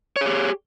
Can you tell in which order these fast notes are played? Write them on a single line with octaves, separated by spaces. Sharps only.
C#5 G#4 G4